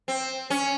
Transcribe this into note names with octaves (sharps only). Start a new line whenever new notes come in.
C4
C#4